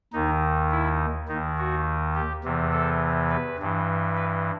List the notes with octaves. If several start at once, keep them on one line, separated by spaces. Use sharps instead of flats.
D#2 D#3 D#4
E4
D#2 D#3 D#4
F#4
G4
E2 C3 E3
A4
B4
G2 E3
B4